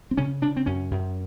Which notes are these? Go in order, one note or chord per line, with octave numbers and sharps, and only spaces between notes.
C4
C#3 C#4
C#3 D4
C4
F#2 C#4
F#2